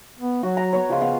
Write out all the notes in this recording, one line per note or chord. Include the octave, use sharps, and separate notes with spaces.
B3
F#3 F#4
A#5
B3 C#5
C#3 F3 G#3 F4
B3 F5